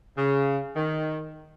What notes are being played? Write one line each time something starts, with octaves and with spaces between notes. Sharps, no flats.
C#3
D#3